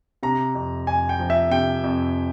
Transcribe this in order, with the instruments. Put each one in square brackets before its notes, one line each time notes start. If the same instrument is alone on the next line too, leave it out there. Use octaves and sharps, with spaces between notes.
[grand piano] C3 A#5
F2
F2 G#5
G5
F3
E5
C3 G5
F2